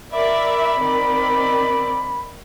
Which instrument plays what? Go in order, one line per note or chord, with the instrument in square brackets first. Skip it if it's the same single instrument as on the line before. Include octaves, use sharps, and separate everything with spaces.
[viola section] A#4 D5 E5 [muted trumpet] B5
[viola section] D#3 C4 D5